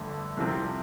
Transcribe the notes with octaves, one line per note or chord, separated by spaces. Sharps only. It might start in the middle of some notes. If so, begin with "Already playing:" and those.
Already playing: G1 F2 D3 A3
C2 C3 F3 C4